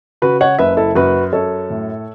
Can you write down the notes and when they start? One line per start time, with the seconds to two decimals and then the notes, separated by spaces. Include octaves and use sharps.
0.22 C#3 F#4 B4
0.41 C#5 F#5
0.59 F#1 B4 E5
0.77 E4 A4
0.95 F#2 F#4 B4
1.33 F#2 A4 C#5
1.70 A2